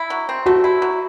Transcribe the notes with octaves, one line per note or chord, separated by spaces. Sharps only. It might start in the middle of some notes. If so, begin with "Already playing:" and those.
Already playing: E4
F#3
C4
A3 F#4
E4
F#3